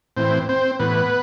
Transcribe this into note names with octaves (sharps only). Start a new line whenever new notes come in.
A2 E3 C4 C5
C4 C5
A2 E3 B3 B4